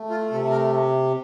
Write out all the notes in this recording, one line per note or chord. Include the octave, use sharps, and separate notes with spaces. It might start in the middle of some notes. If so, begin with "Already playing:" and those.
Already playing: A3
F4
C3 A4
A#4